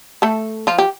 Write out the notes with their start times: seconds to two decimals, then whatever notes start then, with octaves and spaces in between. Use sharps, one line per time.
0.22 A3 A4
0.67 F3 F4
0.78 G4